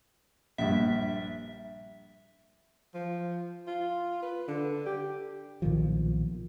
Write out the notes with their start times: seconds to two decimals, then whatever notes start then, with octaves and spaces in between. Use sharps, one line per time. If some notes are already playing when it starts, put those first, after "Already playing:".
0.58 A#1 G2 E5
2.94 F3
3.67 F4
4.22 B4
4.48 D3
4.86 G4
5.62 B1 A#2 D#3 F3